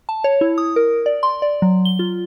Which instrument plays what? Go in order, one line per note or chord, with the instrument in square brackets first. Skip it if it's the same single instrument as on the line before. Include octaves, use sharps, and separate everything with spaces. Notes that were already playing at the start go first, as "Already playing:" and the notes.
[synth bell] A5
C#5
E4
D#6
A#4
D5
C6
D5
F#3
G7
F4